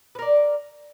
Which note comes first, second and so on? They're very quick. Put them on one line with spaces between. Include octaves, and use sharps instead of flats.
B4 A#4 D5